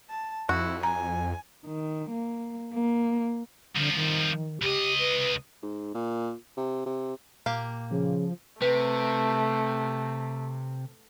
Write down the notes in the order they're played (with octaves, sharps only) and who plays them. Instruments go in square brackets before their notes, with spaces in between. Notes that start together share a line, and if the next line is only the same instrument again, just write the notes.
[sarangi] A5
[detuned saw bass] F2 [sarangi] E4 [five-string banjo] F#4
[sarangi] G#5 [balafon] A#5
[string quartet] D#3
A#3
A#3
[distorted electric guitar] C2 F3 [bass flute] D3
[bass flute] D#3
[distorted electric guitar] C#2 D#5 [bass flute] G4
[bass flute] B4
[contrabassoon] G#2
A#2
C3
C3
[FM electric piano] A#2 [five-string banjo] A#3 G4 F5
[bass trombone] C#3 [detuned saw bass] F3
[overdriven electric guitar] C3 [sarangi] A3 [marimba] B4